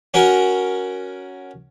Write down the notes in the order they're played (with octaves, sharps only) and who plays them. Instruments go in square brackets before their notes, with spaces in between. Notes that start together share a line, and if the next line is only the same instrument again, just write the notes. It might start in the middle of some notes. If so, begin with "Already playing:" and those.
[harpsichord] C#4 F#4 A#4